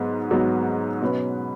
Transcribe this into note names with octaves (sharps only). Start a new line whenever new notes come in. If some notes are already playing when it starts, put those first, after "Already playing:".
Already playing: G#2 F#3 B3 F#4
G#2 F#3 B3 F#4
B2 F#3 C#4 B4